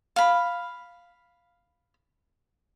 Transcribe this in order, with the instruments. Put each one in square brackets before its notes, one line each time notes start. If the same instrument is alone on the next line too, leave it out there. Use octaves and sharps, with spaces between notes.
[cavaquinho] F5 B5